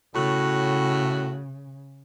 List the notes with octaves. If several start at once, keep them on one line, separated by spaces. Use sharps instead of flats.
A2 C#3 F#4